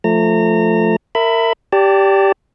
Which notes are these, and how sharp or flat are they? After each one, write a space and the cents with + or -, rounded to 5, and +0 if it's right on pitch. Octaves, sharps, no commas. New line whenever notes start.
F3 +0 A3 +0 A#5 -30
A#4 -25 E5 +0 B5 +15
G4 +0 D5 -25 A5 +20